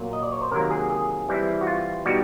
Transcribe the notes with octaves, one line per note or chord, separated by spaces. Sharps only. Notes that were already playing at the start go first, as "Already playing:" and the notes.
Already playing: A#2 F#3 A#3
D#5
D5
C#5
C5
C3 D#3 F#3 A#3 A#4
G#4
G#4
E3 G3 C4 E4
F#4
F4
B2 G3 B3 D#4 F#4